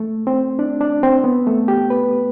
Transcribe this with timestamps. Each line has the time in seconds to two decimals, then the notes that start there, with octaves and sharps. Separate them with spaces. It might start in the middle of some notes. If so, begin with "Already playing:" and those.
Already playing: A3
0.27 C4
0.59 D4
0.81 D4
1.03 C4
1.24 B3
1.47 A3
1.68 G4
1.90 B4